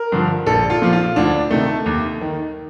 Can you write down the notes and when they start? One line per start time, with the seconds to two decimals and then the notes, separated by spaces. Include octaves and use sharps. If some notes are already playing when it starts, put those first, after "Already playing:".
Already playing: A#4
0.12 G2 D3 F3
0.46 A#1 A4
0.70 F4
0.82 A#2 F3
0.93 F4
1.16 D2 D4
1.51 C3 D#3 A3
1.86 D#2
2.21 D#3